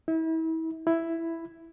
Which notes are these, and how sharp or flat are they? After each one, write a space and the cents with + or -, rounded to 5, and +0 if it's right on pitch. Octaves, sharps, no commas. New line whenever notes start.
E4 -35
E4 +5